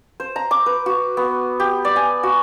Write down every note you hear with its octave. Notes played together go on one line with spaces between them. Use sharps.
C5
A#5
D6
B4
F#4
B3
G4
D5
G#5
F#4